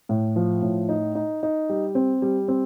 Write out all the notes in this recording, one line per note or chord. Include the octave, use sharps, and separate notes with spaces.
A2
F3
A2
D#4
D#4
D#4
G3
C4
G3
C4